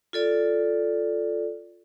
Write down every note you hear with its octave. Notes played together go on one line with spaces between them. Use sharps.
F4 A4 D5